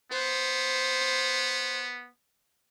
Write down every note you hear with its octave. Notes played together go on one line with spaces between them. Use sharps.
B3 C5